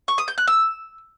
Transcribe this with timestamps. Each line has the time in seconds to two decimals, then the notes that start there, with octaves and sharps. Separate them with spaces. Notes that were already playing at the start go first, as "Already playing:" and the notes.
0.08 C#6
0.18 D#6
0.28 G6
0.38 F#6
0.48 E6